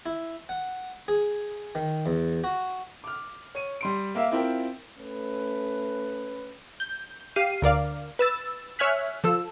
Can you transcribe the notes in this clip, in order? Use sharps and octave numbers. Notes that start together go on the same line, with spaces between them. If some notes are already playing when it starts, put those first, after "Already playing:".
E4
F#5
G#4
D#3
E2
F#4
D6 F6
C#5 D#7
G3 C6 D7
A#3 A#4 E5 F5
C4 E4 F4 A#4 G5
A3 C#4 B4
G6
G4 F5 C7 D#7
D2 A#4 D5 F5
B4 E6 A6
C#5 E5 G#5 F6 F#6 B6
F3 A4 E6